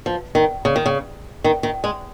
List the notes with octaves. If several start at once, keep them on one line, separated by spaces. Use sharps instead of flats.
F3
D#3
C#3
D#3
C#3
D#3
D#3
G#3